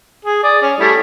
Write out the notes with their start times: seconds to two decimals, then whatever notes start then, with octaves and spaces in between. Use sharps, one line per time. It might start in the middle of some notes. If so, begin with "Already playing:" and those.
0.25 G#4
0.43 D5 D#6
0.62 C#4
0.79 G3 A3 E4